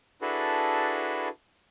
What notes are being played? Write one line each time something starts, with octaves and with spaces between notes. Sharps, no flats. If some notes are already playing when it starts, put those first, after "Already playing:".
D4 E4 F#4 G#4 A4 B4